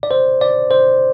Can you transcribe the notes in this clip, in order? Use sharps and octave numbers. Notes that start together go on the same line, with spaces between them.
D5
C5
D5
C5